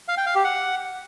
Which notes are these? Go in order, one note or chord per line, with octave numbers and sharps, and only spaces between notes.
F5
G5
F5
G4
F#5